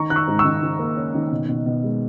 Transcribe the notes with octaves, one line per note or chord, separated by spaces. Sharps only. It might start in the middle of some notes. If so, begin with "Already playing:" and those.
Already playing: D#3 A#5 C#6
D#3 F#6
C#6 E6
G#2
C#6 E6
D#3
D#3
A#3
C#4
D#3
B2
B2
B2
G#3